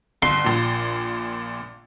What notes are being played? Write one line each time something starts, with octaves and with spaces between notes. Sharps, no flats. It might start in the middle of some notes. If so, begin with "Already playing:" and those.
G1 C6
A#1 A#2